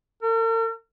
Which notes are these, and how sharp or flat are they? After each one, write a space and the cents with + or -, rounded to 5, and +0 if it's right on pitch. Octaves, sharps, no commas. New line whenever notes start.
A#4 -45